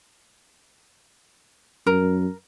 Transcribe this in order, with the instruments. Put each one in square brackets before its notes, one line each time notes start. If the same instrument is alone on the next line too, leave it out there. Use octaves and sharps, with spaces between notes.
[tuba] F#2 [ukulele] A#4